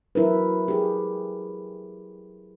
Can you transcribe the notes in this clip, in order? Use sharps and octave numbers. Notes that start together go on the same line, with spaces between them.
F#3 E4 A#4 B4
G4 G#4